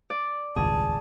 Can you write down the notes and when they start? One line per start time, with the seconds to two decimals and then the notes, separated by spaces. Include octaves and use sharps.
0.10 D5
0.56 D#1 G#1 C#2 G#4 A5